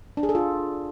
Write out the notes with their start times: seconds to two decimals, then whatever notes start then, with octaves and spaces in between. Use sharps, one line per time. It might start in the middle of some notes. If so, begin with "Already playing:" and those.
0.17 D4
0.23 G#4
0.29 A4
0.35 F4